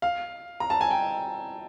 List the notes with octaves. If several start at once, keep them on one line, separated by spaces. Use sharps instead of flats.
F5
A#5
A5
G#5
G5